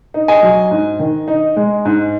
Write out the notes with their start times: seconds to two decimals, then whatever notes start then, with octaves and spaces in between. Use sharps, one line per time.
0.14 D#4
0.28 D#5 G#5
0.43 F#3
0.71 G#2
1.00 D#3
1.28 D#4
1.56 G#3
1.85 G#2